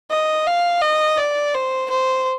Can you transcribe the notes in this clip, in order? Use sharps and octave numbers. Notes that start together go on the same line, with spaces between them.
D#5
F5
D#5
D5
C5
C5